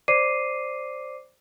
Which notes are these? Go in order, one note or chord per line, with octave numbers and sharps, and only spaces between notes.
C5 D5 D6 C7 D#7